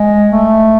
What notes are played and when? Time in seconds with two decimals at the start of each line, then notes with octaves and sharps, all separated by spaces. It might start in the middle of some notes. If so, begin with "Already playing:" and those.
Already playing: G#3
0.31 A3